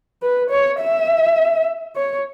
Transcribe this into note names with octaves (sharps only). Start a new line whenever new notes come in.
B4
C#5
E5
C#5